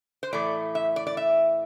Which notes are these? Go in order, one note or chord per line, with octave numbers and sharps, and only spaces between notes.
C5
A2 E3 A3 D5
E5
D5
D5
E5